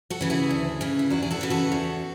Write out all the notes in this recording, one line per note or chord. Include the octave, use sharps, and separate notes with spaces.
F#4 A4
C#3 E3
E4 G#4
D2
C#3 E3
E4
E2 D4 F#4
G#4
F#4 A4
C#3 E3
F#4 A4
E2